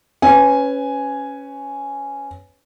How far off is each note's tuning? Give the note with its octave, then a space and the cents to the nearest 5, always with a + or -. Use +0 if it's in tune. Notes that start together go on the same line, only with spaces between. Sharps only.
C#4 +0 B4 +20 G#5 +0